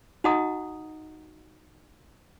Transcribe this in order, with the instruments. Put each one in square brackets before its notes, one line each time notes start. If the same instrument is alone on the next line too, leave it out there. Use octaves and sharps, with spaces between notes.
[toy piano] D#4 F#4 D#5 F#5 A#5 D#6